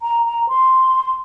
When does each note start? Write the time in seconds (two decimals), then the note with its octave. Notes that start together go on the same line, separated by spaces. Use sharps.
0.02 A#5
0.25 A#5
0.49 C6